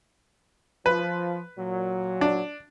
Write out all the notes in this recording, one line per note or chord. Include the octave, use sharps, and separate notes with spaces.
F3 B4
A#2 F#3
D4